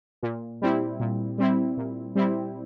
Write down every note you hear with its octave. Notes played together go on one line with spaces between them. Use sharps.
A#2
G3 C4 E4
A#2
G3 C4 E4
A#2
G3 C4 E4